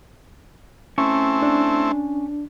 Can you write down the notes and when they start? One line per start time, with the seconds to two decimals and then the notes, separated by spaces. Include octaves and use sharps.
0.98 A3 C4 C#4 E4 C#6
1.43 D4